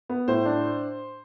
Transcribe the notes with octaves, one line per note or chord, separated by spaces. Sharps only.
B3
A2 C5
D4